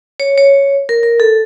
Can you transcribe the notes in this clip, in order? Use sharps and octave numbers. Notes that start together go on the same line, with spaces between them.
C#5
C#5
A#4
A#4
A4